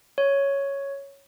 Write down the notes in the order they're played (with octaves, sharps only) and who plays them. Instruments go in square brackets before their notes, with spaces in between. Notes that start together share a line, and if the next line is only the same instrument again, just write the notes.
[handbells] C#5